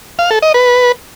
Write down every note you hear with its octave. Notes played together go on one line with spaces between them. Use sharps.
F5
A4
D#5
B4